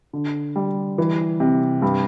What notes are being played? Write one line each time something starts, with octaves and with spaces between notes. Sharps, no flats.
D3
G3
E3
C3
G2